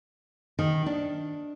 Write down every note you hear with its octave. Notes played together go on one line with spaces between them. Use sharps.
D#3
D4